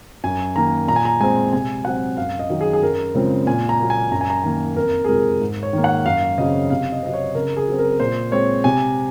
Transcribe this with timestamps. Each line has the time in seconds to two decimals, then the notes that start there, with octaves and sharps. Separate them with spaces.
0.24 F#2 G#5
0.56 D#3 A#3 A#5
0.88 A#2 A#5
0.96 G#5
1.05 A#5
1.21 G#3 C4 G#5
1.53 C3 G#5
1.85 F#3 C4 F#5
2.17 F#2 F5
2.39 D#5
2.50 D#3 F#3
2.61 G#4
2.73 G#4
2.82 F#2 A#4
3.15 C#3 F3 G#3 C4
3.47 A#2 G#5
3.69 A#5
3.79 F#3 A#3
3.90 G#5
4.11 F#2 A#5
4.21 G#5
4.30 A#5
4.44 D#3 A#3 G#5
4.76 F2 A#4
5.05 G#4
5.09 C3 F3 G#3 A#4
5.41 G#2
5.63 C#5
5.73 D#3 A#3
5.84 F#5
6.06 F#2 F5
6.38 C#3 F#3 C4 D#5
6.70 C3 F5
6.92 D#5
7.03 F#3 C4 D#5
7.14 C#5
7.35 C#3 A#4
7.57 G#4
7.68 F#3 C4
7.79 A#4
8.00 A#2 C5
8.32 G#3 C4 C#5
8.64 C3 G#5